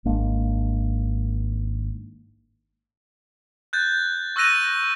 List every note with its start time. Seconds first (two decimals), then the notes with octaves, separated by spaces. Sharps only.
0.05 G#1 G#3 A#3 D4
3.73 F#6 G6 A6
4.36 C#6 E6 F#6 A#6 D#7 F7